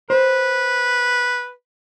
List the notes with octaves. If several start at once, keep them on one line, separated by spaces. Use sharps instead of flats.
B4 C5